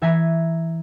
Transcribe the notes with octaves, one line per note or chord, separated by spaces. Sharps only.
E3 E5 G#5 A#5 G#6 B6